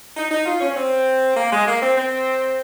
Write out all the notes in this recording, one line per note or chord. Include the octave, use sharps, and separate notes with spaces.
D#4
D#4
F4
C#4
C#4
C4
A#3
G#3
A#3
C4
C4